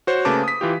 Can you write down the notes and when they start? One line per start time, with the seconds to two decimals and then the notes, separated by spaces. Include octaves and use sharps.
0.07 F#4 C5 C#5
0.25 C#3 A3 A#3 B4 A5 D6
0.44 D#6 B6
0.61 E3 F4 G4